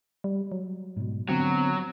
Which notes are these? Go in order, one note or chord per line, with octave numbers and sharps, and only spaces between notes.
G3
F#3
G#2 B2
D3 F#3 B3 C4